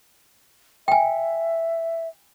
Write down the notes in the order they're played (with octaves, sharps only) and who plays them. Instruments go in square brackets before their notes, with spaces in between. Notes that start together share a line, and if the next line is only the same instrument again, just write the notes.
[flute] E5 [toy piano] G5 G#5